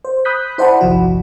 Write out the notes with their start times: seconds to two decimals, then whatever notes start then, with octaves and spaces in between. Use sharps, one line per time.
0.05 C5
0.25 B5 D#6 F#6 G6 B6
0.58 E4 C5 D5 F#5 A5 B5
0.81 G1 C2 F3 F#4